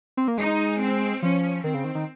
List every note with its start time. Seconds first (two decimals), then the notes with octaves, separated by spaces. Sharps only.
0.17 C4
0.28 A#3
0.38 G#3 D#4
0.79 C4
1.22 F3 C#4
1.64 D#3 C4
1.74 C#3
1.84 D#3
1.95 D#3